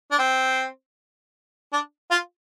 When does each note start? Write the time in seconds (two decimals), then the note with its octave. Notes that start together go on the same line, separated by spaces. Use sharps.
0.11 D4
0.18 C4
1.72 D4
2.11 F4